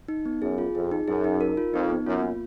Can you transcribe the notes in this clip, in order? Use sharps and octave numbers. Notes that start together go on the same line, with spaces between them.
D#4
B3
F#2 G#4
F4
F2 G#4
D#4
F#2 G#4
D#4
A#4
F4
F2 D#4
B3
F#2 F4
A#3